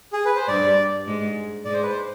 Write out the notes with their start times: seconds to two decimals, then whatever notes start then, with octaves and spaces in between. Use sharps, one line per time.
0.13 G#4
0.25 B4
0.36 C5
0.48 G2 G3 D5
1.07 G#2 G#3
1.65 G#2 G#3 D5
1.74 C5
1.82 B4
1.90 C5